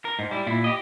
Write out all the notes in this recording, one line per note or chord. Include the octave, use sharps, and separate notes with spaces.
A#4
G#2
G3 E4
A#2 E4
G4 D#5